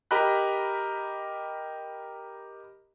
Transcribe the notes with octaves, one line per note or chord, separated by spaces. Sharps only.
G4 A#4 D#5 A#5 B5 F#6